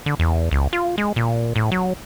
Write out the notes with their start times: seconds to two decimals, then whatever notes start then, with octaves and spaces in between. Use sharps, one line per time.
0.06 D3
0.19 E2
0.51 C#2
0.73 F4
0.98 G#3
1.16 A#2
1.56 A2
1.72 F#3